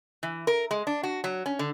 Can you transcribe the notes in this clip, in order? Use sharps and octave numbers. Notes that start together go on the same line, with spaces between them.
E3
A#4
G#3
D4
F#4
F#3
C#4
D3